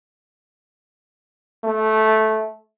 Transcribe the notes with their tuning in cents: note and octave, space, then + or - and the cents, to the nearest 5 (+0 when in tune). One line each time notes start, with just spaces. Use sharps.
A3 -10